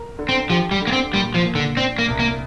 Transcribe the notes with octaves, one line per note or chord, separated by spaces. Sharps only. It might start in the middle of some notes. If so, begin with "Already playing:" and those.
Already playing: A#4
D3
C4
F3 G4
G3
D3
A#3
C4
A#2 G3
F3
A#2
D3
C4 D4
A#3
C2
A#3